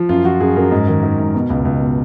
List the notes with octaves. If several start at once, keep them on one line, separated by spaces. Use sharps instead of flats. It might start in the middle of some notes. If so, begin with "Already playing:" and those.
Already playing: F3
F#2 F4
F3 F#4
F#2 G#4
F#2 A#4
G#2
D#3
D#3
G#2
B2
C#2
C#2
B2